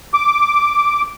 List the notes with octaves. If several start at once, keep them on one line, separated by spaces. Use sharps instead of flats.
D6